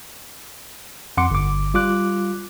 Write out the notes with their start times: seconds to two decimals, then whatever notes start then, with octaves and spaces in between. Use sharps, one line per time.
1.17 F2 F#5 C6 D6 C#7
1.30 G1 D6
1.74 G3 F4 D6 F#6